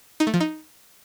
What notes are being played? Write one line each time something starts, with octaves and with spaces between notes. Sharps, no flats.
D#4
A3
F3
D#4